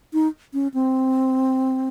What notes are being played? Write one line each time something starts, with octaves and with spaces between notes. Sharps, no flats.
D#4
C#4
C4